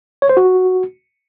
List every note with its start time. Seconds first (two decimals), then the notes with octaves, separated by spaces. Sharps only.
0.22 C#5
0.29 C5
0.37 F#4